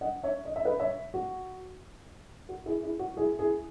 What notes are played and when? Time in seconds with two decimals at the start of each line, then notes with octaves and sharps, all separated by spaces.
0.01 D#5 F#5
0.23 C#5 E5
0.45 D#5
0.56 E5
0.65 B4 D#5
0.80 C#5 E5
1.14 F#4
2.49 F#4
2.66 E4 G#4
2.83 E4 G#4
2.99 F#4
3.17 E4 G#4
3.39 E4 G#4